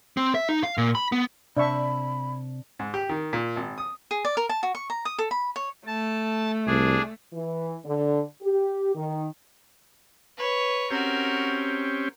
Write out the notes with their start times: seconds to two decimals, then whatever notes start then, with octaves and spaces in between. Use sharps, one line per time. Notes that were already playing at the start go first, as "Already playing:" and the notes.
0.17 C4
0.35 E5
0.49 D#4
0.63 F5
0.78 A#2
0.95 B5
1.12 B3
1.57 C3 D4 D5 E5 A5 B5 C#6
2.79 G#2
2.94 G4
3.09 D#3
3.33 A#2
3.56 G#1
3.78 D#6
4.11 G#4
4.25 D5
4.37 A#4
4.49 A5
4.63 F#4
4.75 C#6
4.90 A#5
5.05 D#6
5.18 A4
5.31 B5
5.56 C#5
5.87 A3 A5
6.67 C2 D4 G#4
7.34 E3
7.86 D3
8.43 G4
8.95 D#3
10.37 B4 C#5
10.91 C4 C#4 F#4 G4 A#4